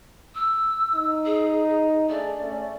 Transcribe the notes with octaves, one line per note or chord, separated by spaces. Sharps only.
E6
D#4
G#4
A3 D4 G#4 D5
A3 C#4